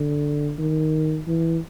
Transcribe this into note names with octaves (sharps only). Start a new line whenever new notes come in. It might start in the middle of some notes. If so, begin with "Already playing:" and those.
Already playing: D3
D#3
E3